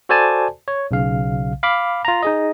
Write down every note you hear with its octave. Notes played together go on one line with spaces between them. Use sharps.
F#4 A4 C5 D5 G#5 A5
C#5
B1 C#3 F5
F5 B5 D6
F4 A#5
D#4 G#4 D#5